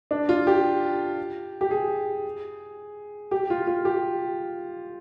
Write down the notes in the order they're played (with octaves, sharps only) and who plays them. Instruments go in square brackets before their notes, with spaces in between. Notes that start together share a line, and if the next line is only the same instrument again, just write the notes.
[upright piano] D4
F4
G4
G4
G#4
G4
F4
F4
G4